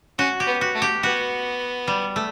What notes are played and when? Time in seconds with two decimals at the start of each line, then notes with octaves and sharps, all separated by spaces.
0.19 C#4 F#4
0.40 G4
0.47 B3
0.61 F#4
0.75 A3
0.82 G4
1.03 B3 F#4
1.88 G3
2.16 A3